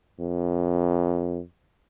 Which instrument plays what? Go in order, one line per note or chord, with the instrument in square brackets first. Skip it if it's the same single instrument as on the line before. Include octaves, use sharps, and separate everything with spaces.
[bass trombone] F2